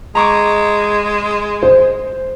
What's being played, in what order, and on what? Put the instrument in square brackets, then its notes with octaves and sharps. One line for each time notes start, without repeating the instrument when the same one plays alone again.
[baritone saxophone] G#3 [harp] A#5 C#6 D6
[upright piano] C5